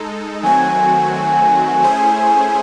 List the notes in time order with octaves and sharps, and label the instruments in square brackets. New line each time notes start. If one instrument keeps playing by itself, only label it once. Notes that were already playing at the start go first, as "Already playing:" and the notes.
Already playing: [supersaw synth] G#3 D#4 A4
[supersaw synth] D#3 F#3 A3 C4 F#4 [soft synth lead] G#5
[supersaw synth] A3 C#4 E4 G#4 C5